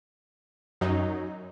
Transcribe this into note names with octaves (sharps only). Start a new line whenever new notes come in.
F#2 F#3 D#4